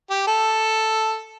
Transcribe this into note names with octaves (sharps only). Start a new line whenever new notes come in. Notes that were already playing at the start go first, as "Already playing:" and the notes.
G4
A4